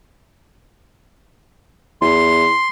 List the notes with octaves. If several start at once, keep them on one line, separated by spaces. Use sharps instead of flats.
E2 C6